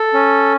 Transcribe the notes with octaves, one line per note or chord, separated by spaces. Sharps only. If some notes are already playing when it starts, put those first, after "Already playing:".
Already playing: A4
C#4